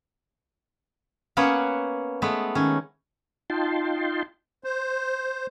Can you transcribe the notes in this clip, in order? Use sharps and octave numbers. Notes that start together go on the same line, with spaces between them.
A#3 B3 C#4 B4 C#5 F#5
G#3 A3 B3
D#3 C#4
D#4 F4 G5 A5 C6
C5